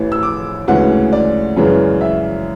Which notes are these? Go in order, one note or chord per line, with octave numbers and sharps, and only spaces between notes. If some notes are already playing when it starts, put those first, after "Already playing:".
Already playing: A1 A2 E3
E6
D6
D2 C#3 E3 G#3 F#5
D5
F#2 C#3 E3 G#3
E5